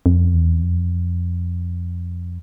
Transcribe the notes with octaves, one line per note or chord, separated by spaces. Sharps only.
F2
E2
F2